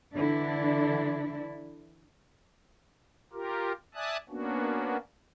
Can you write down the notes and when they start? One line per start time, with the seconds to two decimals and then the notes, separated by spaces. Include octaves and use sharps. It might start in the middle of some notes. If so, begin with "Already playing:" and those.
0.14 D3 E3 D4 E4
3.33 F4 G4 A#4
3.95 D5 E5 G#5 A5 D#6 F#6
4.29 A#3 B3 C#4 D4 F#4